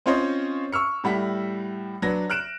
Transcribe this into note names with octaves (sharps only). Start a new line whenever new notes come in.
C4 C#4 F4 C5 C#5 D#5
C#6 E6 F6 C#7
A2 G3 F#5 B6
F#3 D4 B4 A#6
F6 F#6 D7 E7